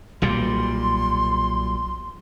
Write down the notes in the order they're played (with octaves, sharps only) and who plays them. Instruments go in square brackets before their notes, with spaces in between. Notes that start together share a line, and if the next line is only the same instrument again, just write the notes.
[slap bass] B1 A#2 G3 [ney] C6